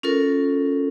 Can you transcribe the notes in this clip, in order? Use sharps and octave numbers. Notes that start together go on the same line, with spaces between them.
C#4 F4 A4 A#4